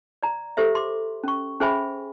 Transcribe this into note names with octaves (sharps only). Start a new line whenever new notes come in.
D5 A#5
G4 A4 C5 E5
C6 D6
C#4 C#6
C#4 G#4 C5 E5 G#5 B5